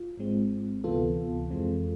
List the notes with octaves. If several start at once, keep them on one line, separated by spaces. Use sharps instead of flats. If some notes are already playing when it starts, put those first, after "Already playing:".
Already playing: F4
G#1 G#2 G#3 C4
D2 C3 E3 B3 F4 A4
F2 E3 G#3 C4